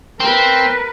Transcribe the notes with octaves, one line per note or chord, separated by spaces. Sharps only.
C4 A#4 B4